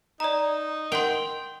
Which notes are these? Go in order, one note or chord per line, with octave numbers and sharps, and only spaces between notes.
D#4 D5 A#5
A#4 F#5 G5 C6